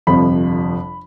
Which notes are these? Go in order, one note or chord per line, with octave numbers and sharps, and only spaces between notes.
G1 F2 C3 F3 B5